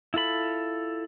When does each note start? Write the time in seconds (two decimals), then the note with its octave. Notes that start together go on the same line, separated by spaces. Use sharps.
0.14 E4 F4 A4 B5